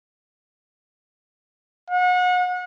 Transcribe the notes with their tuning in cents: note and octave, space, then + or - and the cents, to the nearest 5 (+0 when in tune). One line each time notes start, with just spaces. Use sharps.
F#5 -35